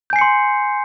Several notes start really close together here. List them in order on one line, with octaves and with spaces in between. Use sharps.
G6 G#5 C7 C#7 C6